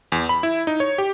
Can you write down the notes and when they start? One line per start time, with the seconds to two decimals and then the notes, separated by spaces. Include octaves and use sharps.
0.12 E2
0.29 B5
0.43 E4
0.67 D#4
0.80 C#5
0.98 G4